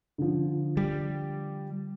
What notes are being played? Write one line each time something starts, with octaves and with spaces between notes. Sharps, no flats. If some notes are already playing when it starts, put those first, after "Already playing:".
D3 F3
G3